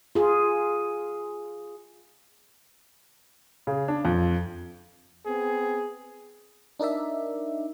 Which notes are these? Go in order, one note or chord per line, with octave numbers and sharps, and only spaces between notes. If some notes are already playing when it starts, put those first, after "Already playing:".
F4 G#4
C#3
D4
F2
B3 C4 G#4
D4 D#4 A#4 D5 E5